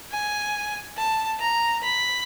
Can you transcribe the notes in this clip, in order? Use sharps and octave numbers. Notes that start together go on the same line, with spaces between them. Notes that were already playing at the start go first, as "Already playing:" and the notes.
G#5
A5
A#5
B5